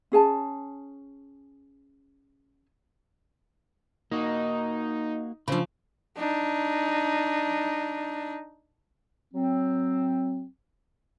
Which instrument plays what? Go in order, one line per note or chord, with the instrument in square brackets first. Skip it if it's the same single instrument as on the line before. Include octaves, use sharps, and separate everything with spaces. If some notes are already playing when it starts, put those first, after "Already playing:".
[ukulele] C#4 G#4 G#5 A5
[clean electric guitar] A#3 F#4 [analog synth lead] D#4
[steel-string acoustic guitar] C#3 F3 [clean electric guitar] D4 C5 B5
[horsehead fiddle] D4 D#4
[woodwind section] F#3 C4